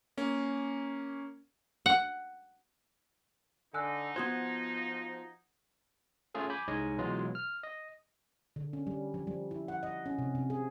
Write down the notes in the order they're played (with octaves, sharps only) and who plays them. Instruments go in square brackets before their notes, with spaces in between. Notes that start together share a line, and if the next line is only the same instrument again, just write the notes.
[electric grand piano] A#3 C#4
[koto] F#5
[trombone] D3 [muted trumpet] D#4 [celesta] G#5 E6 F#6
[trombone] F3 [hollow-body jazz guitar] B3 F#4 C5 [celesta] F#5 D#6 G#6
[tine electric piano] A3 C#4 F4 G#4 A4
G#5 B5 D6 G6
C2 G#3 D#4 C#5 D#5 G#5
B2 E3 F#3 G#3 F4 G#4
F6
D#5
[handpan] D3
C#4
G3
F3
G3
E4
F#5
D#5
C#4
C3
C3
G#4